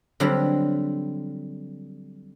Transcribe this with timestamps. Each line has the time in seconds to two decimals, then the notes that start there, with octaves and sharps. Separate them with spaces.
0.20 D3 F#3 G3 C4 A#4 B4